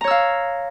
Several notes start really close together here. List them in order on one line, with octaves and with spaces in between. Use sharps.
A#5 C#5 E6 F5